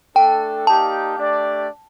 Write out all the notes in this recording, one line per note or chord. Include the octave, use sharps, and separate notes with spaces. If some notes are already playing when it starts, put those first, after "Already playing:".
A3 D4 A4 G5
A#3 D#4 G4 D5 F5 A5
A3 D4 G4 D5